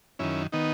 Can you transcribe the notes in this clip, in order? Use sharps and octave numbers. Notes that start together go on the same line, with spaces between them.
F#2 D#3 C#4 E4
D#3 B3 D#4